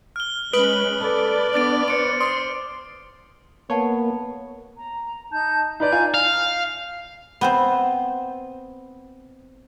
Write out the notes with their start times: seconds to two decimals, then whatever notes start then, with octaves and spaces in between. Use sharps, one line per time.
0.16 F6 G7
0.53 G#3 C#4 B4 D#6 D7 F#7
1.01 A4 D5
1.54 B3 D4 D6 A6 D7
1.88 C5 C#7 D7
2.20 C6 D#6
3.70 A#3 B3 C#5 F#5 A5 C#6
4.77 A#5
5.30 D#4 A5 G6
5.80 D#4 B4 D5 A#5 G6
5.92 F4 G#5
6.14 F5
7.41 B3 C4 C5